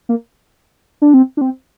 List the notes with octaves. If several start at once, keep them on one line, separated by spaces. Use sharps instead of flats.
A#3
D4
C4
D4
C4